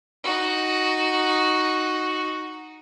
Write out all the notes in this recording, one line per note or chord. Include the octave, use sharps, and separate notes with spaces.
D#4 F#4